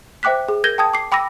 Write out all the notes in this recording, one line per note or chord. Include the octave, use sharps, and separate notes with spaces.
C5 E5 G5 D6 F#6 B6
G#4
A#4 G6 G#6 A#6 G7
G5 A5 D#6 G#6
D6 C7
G5 B5 D6 E6 A#6